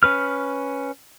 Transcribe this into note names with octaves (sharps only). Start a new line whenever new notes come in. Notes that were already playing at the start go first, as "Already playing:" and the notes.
C#4 B4 F6